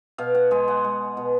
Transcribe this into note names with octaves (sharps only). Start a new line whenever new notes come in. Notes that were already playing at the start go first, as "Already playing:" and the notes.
B2 F5
F#5
G#3 G#5
F#5
G#3
B2